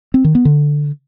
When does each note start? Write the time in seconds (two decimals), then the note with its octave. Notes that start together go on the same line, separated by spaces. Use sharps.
0.14 C4
0.24 D#3
0.35 B3
0.45 D3